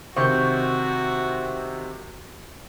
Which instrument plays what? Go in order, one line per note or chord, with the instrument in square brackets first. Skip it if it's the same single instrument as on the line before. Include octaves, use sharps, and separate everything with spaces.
[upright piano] C3 D#3 C4 [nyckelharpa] F#4 [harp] C#6 G6